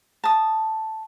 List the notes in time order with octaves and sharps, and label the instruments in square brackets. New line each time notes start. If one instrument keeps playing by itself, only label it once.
[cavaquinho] A5 D#6